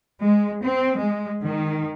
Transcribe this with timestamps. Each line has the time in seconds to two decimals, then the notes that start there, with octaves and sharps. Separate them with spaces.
0.24 G#3
0.64 C4
0.98 G#3
1.44 D#3